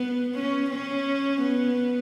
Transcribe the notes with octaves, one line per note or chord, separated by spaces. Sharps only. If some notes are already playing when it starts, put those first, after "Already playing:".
Already playing: B3
C#4
C#4
B3